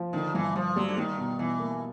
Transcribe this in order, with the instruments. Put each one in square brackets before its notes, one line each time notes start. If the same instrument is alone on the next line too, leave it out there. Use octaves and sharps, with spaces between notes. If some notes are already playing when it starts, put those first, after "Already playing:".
Already playing: [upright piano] F3
[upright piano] D3 [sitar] D#3
[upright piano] G2 [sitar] E3
[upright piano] G2 [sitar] F3
[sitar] F#3 [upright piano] G3
[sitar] D3
[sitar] D#3 [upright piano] G3
[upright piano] B2
[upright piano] B2 [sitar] E3
[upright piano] A#3